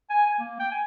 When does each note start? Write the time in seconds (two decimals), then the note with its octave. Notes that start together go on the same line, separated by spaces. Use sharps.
0.10 G#5
0.26 G#5
0.39 A#3
0.60 G5
0.72 G#5